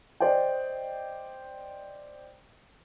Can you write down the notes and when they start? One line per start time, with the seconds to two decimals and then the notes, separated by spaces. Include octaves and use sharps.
0.20 C5 D5 D#5 G5